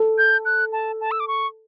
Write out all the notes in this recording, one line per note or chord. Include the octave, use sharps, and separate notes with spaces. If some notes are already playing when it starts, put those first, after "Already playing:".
Already playing: A4
G6
F#6
A5
A5
E6
D6
C#6